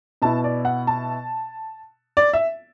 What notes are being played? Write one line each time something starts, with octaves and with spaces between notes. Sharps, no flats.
B2 B3 E4 A5
D5
F#5
A5
D5
E5